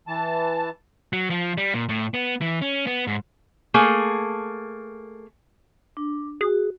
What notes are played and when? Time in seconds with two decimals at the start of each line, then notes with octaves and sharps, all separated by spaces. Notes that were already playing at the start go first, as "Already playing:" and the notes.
0.08 E3 A5
1.13 F#3
1.30 F3
1.58 G3
1.74 A#2
1.89 A2
2.14 B3
2.41 E3
2.62 C#4
2.87 B3
3.07 G#2
3.74 A3 A#3 G#4
5.97 D4
6.41 F#4 G#4